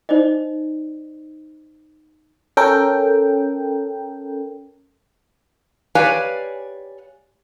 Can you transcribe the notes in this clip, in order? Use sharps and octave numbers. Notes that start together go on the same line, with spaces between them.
D#4 C5 D5 D#5
C#4 A4 A#4 G5
G4 B4 C#5 D5 F5 G#5